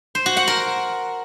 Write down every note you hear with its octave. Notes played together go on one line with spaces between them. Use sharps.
C5
F#4
F#5
A#4